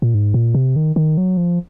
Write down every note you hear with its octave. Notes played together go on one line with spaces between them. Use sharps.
A#2
G#2
A#2
C3
D#3
D#3
F#3
F3